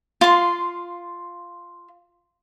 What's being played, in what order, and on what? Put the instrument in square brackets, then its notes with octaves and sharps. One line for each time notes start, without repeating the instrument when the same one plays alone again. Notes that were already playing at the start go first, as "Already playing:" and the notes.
[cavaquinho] F4 C6